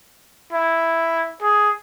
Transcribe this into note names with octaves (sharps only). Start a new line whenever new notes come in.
E4
G#4